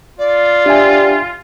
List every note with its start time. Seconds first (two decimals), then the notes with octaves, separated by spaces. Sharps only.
0.18 F4 D5
0.66 D4 G4 E5 G#5